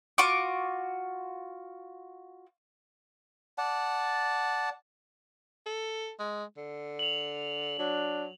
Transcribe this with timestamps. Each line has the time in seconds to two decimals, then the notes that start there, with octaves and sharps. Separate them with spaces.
0.18 F4 F#4 C#6 D6
3.58 D5 F#5 A5
5.66 A4
6.19 G#3
6.57 D3
6.99 F7 F#7
7.79 F#3 D4